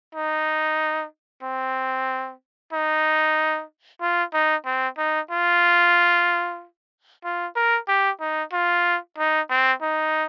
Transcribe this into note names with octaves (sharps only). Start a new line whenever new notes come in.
D#4
C4
D#4
F4
D#4
C4
D#4
F4
F4
A#4
G4
D#4
F4
D#4
C4
D#4